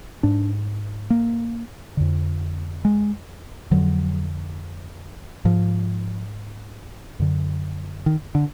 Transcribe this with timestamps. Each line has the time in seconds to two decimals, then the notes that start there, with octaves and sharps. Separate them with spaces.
0.23 G#2 D4
1.10 A#3
1.97 F2 D3
2.85 G#3
3.71 F2 D3 F#3
5.45 G#2 F3
7.20 F#2 D3
8.06 D#3
8.35 D3